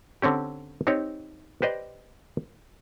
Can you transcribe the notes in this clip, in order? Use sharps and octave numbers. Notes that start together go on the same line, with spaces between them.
D3 C4 C#4 G4
C4 D#4 G4 C#5
G4 B4 C5 D5 D#5